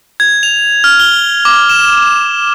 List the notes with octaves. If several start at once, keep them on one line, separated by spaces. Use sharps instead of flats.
G#6
F7
F6
G7
D6
E7